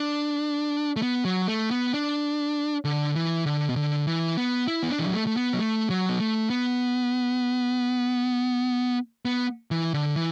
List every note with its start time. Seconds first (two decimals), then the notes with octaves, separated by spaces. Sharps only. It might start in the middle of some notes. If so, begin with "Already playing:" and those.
Already playing: D4
0.96 A3
1.02 B3
1.25 F#3
1.48 A3
1.71 B3
1.93 D4
2.85 D3
3.15 E3
3.46 D3
3.69 B2
3.76 D3
4.07 E3
4.37 B3
4.67 E4
4.83 B3
4.91 D4
5.00 E3
5.07 F#3
5.13 A3
5.27 A3
5.37 B3
5.54 F#3
5.59 A3
5.90 F#3
6.09 B3
6.20 A3
6.50 B3
9.25 B3
9.71 E3
9.94 D3
10.16 E3